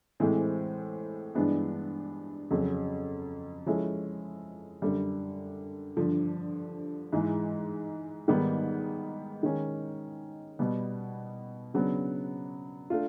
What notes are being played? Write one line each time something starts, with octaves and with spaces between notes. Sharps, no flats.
A2 E3 G#3 C4
G2 E3 G#3 B3 D4
F2 C#3 F#3
F3 G#3 C#4 E4 A4
F#2 D3 G3
G2 D3 F3
G#2 E3 G#3
G#2 D#3 G3 B3
D#3 G#3 C#4
B2 G3 B3
C#3 F#3 B3 D4
A3 D4 F4